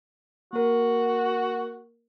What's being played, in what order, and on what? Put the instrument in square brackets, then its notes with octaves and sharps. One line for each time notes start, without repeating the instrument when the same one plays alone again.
[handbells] A#3 A#4 [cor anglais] F#4